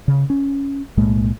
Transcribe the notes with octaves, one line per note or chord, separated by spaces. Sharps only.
C#3
C#4
B1 A2 G#3 A#3